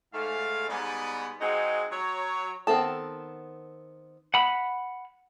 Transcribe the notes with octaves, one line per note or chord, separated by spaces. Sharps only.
G#2 A3 F5
G#2 G3 B3
G#3 C4 D#4 F#4 G#4
F#3 C#5 A#5
D#3 B3 C4 A4 A5
F#5 B5